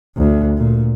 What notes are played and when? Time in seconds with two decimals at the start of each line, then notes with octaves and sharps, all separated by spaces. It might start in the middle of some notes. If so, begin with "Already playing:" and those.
0.17 D2
0.57 A#2